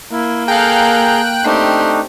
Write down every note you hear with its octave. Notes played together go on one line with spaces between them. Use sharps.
A#3 E4
G#4 A4 F5 G5 A#5 F#6 G6
A3 C4 D4 D#4 G4